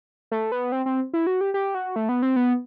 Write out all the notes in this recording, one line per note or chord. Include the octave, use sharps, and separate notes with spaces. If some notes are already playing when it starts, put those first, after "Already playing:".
A3
B3
C4
C4
E4
F#4
G4
G4
F#4
A3
B3
C4
B3